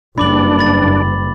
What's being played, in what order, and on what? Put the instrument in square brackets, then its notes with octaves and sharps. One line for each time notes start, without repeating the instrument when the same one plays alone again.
[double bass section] F#1 G2 [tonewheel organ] D4 [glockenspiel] B5 D6 F#7
[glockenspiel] B5 A6